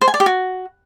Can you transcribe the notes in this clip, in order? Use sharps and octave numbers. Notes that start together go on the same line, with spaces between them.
C5
G#5
D5
G4
F#4